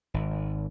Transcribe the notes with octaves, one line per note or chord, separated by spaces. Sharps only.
G#1